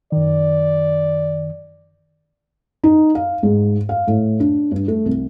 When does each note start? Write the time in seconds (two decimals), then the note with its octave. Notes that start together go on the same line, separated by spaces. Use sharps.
0.12 F#2 D#3 D5
2.84 D#4
3.15 F5
3.43 G#2
3.89 F5
4.07 A2
4.40 D4
4.72 G2
4.88 A3
5.05 C2